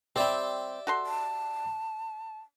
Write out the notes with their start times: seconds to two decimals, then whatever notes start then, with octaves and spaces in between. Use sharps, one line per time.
0.16 G3 C4 G4 D5 E5
0.87 F#4 A4 C6
1.06 A5